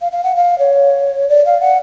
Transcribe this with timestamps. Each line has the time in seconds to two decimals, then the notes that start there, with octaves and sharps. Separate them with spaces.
0.01 F5
0.12 F5
0.24 F#5
0.36 F5
0.58 C#5
1.29 D5
1.45 F5
1.61 F#5